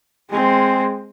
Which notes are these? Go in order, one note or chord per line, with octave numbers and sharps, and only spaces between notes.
G#3 C4